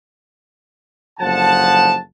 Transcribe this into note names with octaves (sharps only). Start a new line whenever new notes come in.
F#1 D3 F3 F#5 A5